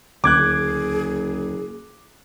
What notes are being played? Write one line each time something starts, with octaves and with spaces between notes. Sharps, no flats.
F#1 D2 G#4 D6 F#6 G#6